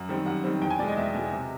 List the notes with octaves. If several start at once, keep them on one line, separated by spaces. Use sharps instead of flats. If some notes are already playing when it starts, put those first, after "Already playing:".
Already playing: F#2 F#5
D#3 G3 C4
F#2 F#5
D#3 G3 C4
E2 G5
G#5
B2 G#3 D5
D#5
E2 E5
B2 G#3
C3